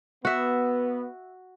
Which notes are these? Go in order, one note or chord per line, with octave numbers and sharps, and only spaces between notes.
B3 F#4 E5